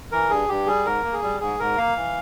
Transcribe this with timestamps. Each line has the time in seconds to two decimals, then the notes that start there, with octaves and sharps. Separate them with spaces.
0.12 E3 A#4
0.30 G2 G#4
0.49 G2 G4
0.67 G3 G#4
0.85 G#2 A#4
1.04 A#3
1.13 G#4
1.22 G3
1.41 G#2 G#4
1.60 G#2 A#4
1.78 A#3 F5
1.96 E3